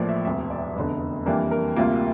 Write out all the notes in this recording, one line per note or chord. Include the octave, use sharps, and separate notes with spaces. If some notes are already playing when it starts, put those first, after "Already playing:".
Already playing: A1 A2 F3 A#3 D5
E5
E1 D2 C3 E5
D5
F1 E2 D3
F2 E3 G3 A#3 D4 A#4
A#4
D2 C3 G3 A#3 F4